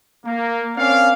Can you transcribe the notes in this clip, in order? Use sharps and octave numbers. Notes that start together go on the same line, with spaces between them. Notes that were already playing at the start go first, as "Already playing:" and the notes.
A#3
A#3 C4 C#4 D5 F5